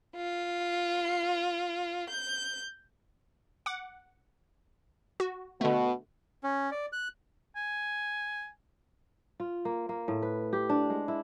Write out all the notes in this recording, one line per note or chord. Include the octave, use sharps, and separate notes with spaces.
F4
G6
F#5 D6
F#4
B2 D3 A3
C#4
D5
F#6
G#5
F4
A#3
A#3
A2
B4
G4
D4
G#3
E4